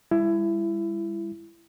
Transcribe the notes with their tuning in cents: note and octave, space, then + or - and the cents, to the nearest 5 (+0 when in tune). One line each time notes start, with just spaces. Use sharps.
G3 +40 E4 +20